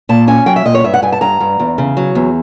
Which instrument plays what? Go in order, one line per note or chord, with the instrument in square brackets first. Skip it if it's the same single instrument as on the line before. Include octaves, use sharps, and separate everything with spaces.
[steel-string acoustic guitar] A#2 A5
C#4 G#5
F#3 G5
E5
A#2 D#5
C#5
G2 E5
F#5
G2 G#5
A5
G2 A#5
G2
E2
C#3
F#3
E2